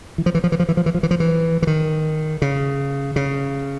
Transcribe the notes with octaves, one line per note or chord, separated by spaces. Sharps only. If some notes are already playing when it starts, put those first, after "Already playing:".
E3
F3
E3
F3
E3
F3
E3
F3
E3
F3
E3
F3
E3
E3
D#3
C#3
C#3